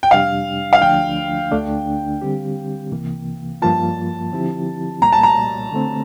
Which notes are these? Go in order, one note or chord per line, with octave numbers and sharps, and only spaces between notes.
G5
F2 C3 G3 D4 G4 F5
F5
D2 D3 F3 A3 D4 G5
D2 D3 A3 D4
D3 G3 C4 G4
C2 C3 E3 A#3
G2 F3 A#3 F4 A5
D3 F3 C4 E4 G4
C2 A#2 G3 A#3 A#5
A5
A#5
D3 A3 C4